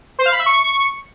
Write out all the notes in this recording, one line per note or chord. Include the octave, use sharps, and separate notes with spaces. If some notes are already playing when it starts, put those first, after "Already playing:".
C5
F5
B5
E5
C#6